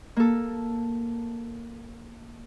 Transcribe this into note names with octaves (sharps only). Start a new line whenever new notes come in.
A#3 A4